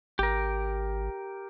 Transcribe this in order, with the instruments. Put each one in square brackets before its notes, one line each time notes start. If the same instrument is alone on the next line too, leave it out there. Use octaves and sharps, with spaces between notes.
[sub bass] G#1 [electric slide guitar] G4 A#4